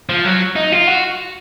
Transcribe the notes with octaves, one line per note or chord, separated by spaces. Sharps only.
F3
F#3
D#4
F4
F#4